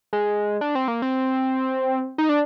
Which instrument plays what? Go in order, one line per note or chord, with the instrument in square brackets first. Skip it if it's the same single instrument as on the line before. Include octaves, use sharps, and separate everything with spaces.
[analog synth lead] G#3
D4
C4
A#3
C4
D#4
D4